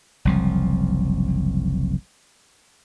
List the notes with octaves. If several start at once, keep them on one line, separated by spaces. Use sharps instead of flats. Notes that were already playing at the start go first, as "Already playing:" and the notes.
F#1 C2 F3